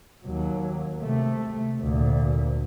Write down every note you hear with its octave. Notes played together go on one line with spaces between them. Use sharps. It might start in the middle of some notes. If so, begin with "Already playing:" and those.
D#2 F#3
C3 A3
D2 A#2